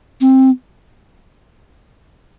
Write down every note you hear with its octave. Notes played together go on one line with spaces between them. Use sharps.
C4